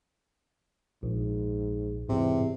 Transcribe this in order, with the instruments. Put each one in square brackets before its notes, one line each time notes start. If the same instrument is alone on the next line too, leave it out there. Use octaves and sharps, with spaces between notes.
[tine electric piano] A#1 [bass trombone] G#2
[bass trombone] E2 [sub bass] G#2 [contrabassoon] C3